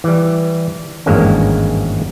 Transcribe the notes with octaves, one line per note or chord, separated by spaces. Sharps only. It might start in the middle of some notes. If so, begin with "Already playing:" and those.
E3 G3
G#1 E2 G2 G#3 A#3 C#4